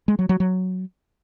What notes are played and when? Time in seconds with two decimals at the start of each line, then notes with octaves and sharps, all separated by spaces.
0.08 G#3
0.19 F#3
0.29 F#3
0.40 F#3